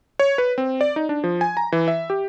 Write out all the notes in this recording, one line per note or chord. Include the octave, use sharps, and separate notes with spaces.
C#5
B4
C4
D5
D#4
D4
F3
G#5
A#5
E3
E5
G4